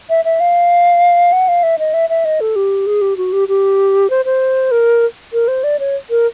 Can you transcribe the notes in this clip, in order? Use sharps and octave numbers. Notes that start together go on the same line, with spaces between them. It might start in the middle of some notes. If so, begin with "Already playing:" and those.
E5
E5
F5
F#5
F5
E5
D#5
E5
E5
D#5
A4
G4
G#4
G4
F#4
G4
G4
C5
C5
A#4
A#4
C5
D5
C#5
A#4